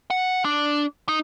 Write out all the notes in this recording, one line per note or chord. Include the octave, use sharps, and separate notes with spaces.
F#5
D4
D#4